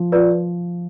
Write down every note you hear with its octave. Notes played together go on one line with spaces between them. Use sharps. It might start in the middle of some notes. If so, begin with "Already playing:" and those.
Already playing: F3
F4 B4 D5